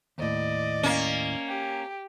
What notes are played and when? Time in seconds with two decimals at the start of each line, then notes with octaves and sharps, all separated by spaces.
0.18 D#2 A2 D5 D#5
0.83 A#3 C#4
1.47 G4